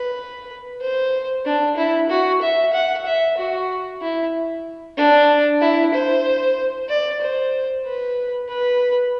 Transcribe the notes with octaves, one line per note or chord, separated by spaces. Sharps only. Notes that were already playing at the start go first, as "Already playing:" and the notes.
Already playing: B4
C5
D4
E4
F#4
E5
F#5
E5
F#4
E4
D4
E4
C5
D5
C5
B4
B4